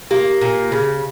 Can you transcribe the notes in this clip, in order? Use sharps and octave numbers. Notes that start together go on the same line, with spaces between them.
A#3 G4
A#2
C#3